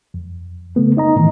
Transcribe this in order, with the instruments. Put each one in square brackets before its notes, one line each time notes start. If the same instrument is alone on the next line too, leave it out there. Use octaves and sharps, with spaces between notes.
[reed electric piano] F2
C#3 A3 B3
D#4 D#5 A#5
A2 D#3 E3